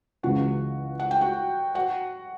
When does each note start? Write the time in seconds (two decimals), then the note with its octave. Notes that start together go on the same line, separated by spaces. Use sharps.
0.23 C#2 C#3 E3 F#4 F#5
1.00 F#5
1.11 G5
1.21 F#4 F#5
1.75 F#4 F#5